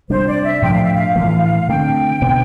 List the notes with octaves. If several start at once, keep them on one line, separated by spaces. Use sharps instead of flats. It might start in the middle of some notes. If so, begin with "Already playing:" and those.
C3 G3 D4 C5
D5
E5
A2 F3 A3 D4 G5
F5
E5
F5
A2 E3 A3
D3 A3 C4 G5
B2 B3 D4